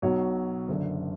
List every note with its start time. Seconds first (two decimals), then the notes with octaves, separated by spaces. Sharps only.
0.02 B1 B2 F#3 C#5
0.68 F#1 F#2 D3